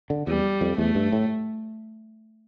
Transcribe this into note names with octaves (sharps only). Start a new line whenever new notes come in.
D3
E2 G3
F2
E2 A3
G2
A2